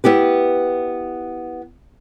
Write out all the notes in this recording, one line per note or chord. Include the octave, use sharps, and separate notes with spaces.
B3 E4 G4 B4